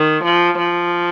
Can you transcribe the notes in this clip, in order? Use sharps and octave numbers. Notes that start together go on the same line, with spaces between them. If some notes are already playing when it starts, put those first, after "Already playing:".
Already playing: D#3
F3
F3